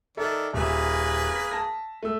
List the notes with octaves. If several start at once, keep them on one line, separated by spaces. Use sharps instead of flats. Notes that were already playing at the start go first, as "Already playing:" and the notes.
D#3 A4 A#4 D5 E5
D#1 A#3 G#4 B4 E5
B6
A5 A#6
A3 E6